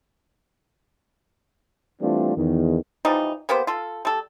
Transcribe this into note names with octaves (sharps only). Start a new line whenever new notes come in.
E3 G3 A3 C4 D4 F4
E2 D#3
E3 F3 G3 D#4
A#3 B3 G4 C5
F4 A4
G3 A4